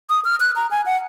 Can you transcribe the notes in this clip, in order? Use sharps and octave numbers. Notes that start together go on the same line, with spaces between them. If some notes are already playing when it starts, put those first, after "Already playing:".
D#6
F6
F#6
A#5
G#5
F#5